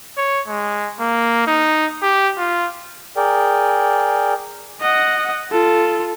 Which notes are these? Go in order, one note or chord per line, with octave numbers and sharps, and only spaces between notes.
C#5
G#3
A#3
D#4
G4
F4
G#4 A#4 D5 G5
D#5 F#5
F4 A4